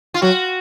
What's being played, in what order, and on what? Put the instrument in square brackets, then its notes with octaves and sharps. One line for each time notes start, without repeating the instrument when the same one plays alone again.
[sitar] F4
[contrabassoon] F#3 [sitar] F#4